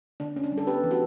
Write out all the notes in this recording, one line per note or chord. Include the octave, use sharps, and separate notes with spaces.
D3 D4
D3 C#4
D4
G3
A4
B3 G4 B4
E3
F#4 A4